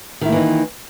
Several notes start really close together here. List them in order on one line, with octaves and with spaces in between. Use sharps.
D#3 E4 A#3 E3 D#4